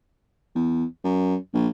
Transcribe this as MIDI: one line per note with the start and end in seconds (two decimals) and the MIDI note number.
0.55 0.85 40
1.04 1.36 42
1.54 1.68 34